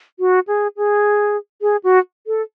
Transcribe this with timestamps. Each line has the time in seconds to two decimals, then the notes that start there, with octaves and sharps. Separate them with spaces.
0.20 F#4
0.47 G#4
0.77 G#4
1.62 G#4
1.84 F#4
2.27 A4